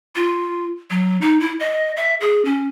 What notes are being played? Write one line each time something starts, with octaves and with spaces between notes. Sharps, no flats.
F4
F#3
D#4
E4
D#5
E5
G#4
C#4